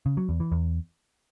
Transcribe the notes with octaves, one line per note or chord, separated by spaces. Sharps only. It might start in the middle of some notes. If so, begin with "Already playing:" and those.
C#3
F#3
E2
E3
E2